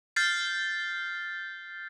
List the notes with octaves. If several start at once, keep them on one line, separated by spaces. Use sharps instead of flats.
F6 G6 A6 C7